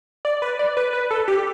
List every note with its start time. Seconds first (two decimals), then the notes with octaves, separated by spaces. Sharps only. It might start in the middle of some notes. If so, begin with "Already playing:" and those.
0.25 D5
0.42 B4
0.59 D5
0.77 B4
0.93 B4
1.11 A4
1.28 G4